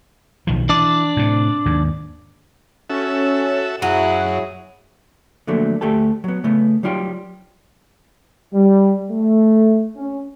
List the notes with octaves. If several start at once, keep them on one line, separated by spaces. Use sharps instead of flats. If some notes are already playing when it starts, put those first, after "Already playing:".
B1 D#3 F3
E3 D4 D5
A2 C3
D#2 G#2
C#4 F#4 A4 E5
F#2 F#3 E4 G#4 F#6
D3 F3 F#3 A3 A#3
D2 A3 G4 A4 A5
F#3 B3
C#3 A3 B3
F#3 G3 D#4 F4 G5 C6
G3
A3
C#4